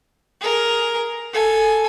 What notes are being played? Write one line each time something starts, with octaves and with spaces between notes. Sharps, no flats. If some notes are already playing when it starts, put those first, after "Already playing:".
G#4 A#4
A4 G#5